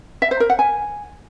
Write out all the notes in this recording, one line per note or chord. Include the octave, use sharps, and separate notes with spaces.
E5
C5
A#4
F#5
G#5